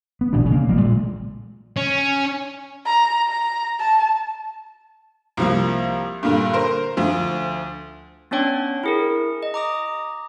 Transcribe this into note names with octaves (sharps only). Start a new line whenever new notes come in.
B3
D1 A1 B2 D4
C#3 A#3
A1 F#3 G3 A#3
A#2 G#3
C#4
A#5
A#5
A5
C2 F3 A#3
G2 A#2 D3
A#4 C5
D2 F3
B3 C#4 D4 C#5 G5
E4 G#4 A#4
D#5
A#5 D6 D#6